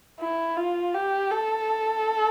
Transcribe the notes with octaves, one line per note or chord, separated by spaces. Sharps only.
E4
F4
G4
A4